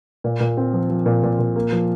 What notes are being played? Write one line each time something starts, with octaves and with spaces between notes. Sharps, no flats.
A#2
A#2
C4
F3
F3
A#2
A#2
A#2
A#3
F3